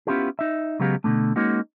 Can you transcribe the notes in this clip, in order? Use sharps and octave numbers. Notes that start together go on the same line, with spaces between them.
B3 C#4 E4 F4 G4 G#4
D#4 E5
C#3 F#3 G#3 B3 G4 F5
B2 D3 A3
G#3 A#3 C#4 D#4 F#4